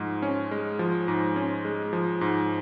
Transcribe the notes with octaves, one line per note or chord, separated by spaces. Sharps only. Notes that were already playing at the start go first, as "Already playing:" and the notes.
Already playing: G#2 F3 G#3
C#4
G#3
F3
G#2
C#4
G#3
F3
G#2